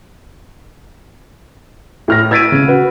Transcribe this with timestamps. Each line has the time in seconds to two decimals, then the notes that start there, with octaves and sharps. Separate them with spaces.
2.08 A2 F6 A#6
2.31 E6 G#6 A6 B6 D7 D#7
2.52 C#3
2.67 F#4 B4 F#5